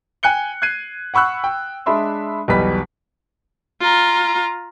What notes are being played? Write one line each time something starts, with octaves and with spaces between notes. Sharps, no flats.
G5 G#5 F#6 C#7 G7
F#6 G#6 C7 D#7
F#5 B5 C#6 E6 F#6
G5
G#3 D4 E5 B5 C6
B1 E2 B2 G3 B4 B6
F4 A#5